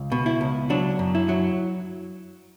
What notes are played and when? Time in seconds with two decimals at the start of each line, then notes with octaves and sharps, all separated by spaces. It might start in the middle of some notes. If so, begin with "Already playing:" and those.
Already playing: C#2
0.12 B2
0.26 E4
0.41 C#2
0.70 F#3 D4
0.99 F#2
1.15 E4
1.29 F#3